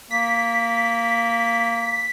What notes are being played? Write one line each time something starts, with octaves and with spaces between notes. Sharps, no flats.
A#3 B6